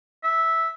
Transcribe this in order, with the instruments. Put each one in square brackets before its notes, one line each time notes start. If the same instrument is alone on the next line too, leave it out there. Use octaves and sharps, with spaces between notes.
[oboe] E5